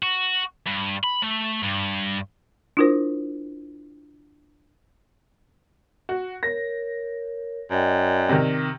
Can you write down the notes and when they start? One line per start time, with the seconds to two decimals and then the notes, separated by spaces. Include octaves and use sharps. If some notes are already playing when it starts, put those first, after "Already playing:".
0.03 F#4
0.67 G2
1.04 B5
1.23 A3
1.64 G2
2.77 D4 E4 F4 A#4 C5
6.09 F#4
6.43 A#4 C#5 A#6
7.71 F#2 D5 D#5 G5
8.29 C3 D#3